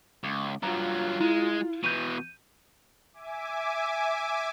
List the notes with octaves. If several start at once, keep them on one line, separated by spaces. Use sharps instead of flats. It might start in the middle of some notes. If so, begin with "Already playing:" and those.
C#2
G2 F#3 F4 A#5
G#3 E4
B2 E3 G6 D#7
E5 G#5 D6